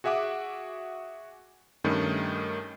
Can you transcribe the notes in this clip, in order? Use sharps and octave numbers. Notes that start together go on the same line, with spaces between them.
F#4 G#4 E5 F#5 D6
G2 D#3 A3 C#4